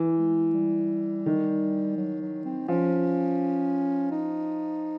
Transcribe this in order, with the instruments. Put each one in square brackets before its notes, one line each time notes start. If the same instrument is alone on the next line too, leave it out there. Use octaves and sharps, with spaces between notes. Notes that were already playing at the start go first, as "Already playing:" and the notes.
Already playing: [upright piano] E3
[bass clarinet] G#3
G3
[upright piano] D#3
[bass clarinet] F#3
F#3
C4
[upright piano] F3 [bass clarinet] C#4
[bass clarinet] D#4